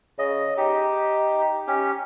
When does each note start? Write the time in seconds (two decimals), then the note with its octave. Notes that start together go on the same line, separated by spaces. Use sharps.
0.19 C#3 D#5
0.57 D#4 G4
1.67 C#4 G4